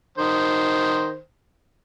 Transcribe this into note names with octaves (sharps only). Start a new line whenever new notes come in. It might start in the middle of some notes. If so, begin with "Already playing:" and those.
D#3 C5